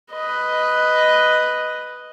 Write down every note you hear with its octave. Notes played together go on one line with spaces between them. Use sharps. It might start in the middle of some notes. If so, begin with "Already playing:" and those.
B4 D#5